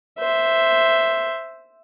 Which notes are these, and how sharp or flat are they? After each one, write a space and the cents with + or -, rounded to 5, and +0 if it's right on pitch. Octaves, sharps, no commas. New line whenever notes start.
C5 +0 E5 +0